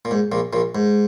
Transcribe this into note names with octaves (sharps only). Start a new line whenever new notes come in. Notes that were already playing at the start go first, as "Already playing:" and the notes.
A#2
G#2
A#1 A#2
A#1 A#2
G#2